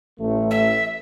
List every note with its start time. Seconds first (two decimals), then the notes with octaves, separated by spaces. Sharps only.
0.19 A1 A3
0.51 E5